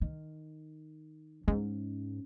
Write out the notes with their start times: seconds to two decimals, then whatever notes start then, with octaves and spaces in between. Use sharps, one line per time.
0.01 D#3
1.48 G#2 C#4